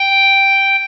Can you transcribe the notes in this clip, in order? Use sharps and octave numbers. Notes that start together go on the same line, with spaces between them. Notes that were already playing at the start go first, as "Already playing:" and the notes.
Already playing: G5